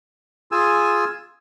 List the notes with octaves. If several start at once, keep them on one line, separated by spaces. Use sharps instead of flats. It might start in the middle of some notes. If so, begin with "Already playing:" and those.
F4 G#4 G#5 E6